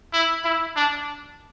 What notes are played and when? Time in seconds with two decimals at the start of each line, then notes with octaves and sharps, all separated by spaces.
0.13 E4
0.44 E4
0.76 D4